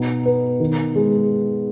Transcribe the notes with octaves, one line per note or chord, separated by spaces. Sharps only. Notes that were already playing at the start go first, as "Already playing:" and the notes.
Already playing: B2 D#4
B3
D#3
G#3